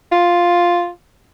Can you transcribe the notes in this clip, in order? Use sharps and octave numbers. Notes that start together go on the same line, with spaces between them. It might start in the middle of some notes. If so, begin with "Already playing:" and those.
F4